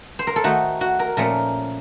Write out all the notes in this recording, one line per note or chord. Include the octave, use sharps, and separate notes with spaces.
C5
A#4
A4
D#3 A3 D#4 F#4
F#4
A#4
A#2 F3 A3 C#4 A#4